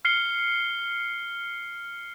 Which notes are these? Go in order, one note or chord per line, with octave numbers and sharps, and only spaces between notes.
F6 C7 C#7 G7